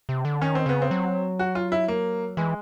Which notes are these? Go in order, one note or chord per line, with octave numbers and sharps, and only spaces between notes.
C3
D3
D#3 C#4
C4
C#3 B3
C4
F#3
F#4
F4
E4
A#3
E3 G#3